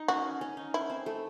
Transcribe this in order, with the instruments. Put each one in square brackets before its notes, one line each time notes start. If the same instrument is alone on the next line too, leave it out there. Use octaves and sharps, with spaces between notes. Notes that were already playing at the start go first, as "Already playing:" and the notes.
Already playing: [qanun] D#4
[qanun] C#4 [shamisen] F#4
[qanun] C#4
D#4
[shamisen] E4
[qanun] C4
A3